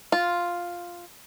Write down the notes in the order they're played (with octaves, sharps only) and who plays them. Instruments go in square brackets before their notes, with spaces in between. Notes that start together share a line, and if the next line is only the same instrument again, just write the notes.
[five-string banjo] F4